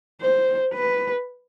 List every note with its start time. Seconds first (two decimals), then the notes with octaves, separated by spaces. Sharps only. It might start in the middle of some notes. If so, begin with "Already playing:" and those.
0.22 C5
0.74 B4